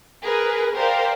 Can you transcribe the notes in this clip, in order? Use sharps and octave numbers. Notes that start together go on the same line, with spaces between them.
G#4 A#4 B4
G4 A#4 C5 D5 F5